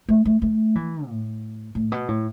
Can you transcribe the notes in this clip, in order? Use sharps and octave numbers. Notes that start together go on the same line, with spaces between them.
A3
A3
A3
E3
A2
A2
B2
A2